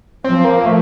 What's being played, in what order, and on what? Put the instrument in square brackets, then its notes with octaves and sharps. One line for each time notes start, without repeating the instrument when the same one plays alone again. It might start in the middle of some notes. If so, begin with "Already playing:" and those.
[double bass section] F3 [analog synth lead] C4
[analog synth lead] A#3
A3